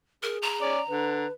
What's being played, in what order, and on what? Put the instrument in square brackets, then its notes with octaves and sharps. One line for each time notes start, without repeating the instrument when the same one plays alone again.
[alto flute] G#4 [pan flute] A#4
[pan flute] A#5
[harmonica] C#4 D5
[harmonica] D3 [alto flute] B4